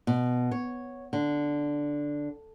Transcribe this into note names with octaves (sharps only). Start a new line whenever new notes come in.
B2
C#5
D3